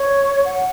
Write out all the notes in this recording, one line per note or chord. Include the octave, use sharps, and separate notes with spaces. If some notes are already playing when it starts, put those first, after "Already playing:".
Already playing: C#5
F#5